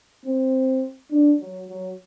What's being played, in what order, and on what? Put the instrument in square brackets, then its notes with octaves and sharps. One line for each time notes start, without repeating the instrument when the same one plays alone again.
[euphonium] C4
D4
F#3
F#3